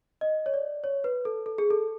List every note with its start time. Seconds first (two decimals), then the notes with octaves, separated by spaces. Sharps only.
0.21 D#5
0.46 C#5
0.54 D5
0.84 C#5
1.04 B4
1.25 A4
1.46 A4
1.58 G#4
1.71 A4